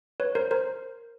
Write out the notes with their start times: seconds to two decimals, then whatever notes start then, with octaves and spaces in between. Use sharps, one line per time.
0.20 B4 C#5
0.35 A#4 C5
0.51 A#4 C5